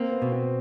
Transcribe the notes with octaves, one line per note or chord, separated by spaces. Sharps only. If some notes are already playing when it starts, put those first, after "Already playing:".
Already playing: A#3 C4
B3
B2
C4